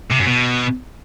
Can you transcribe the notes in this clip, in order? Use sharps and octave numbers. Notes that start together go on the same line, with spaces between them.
C3
F#2
B2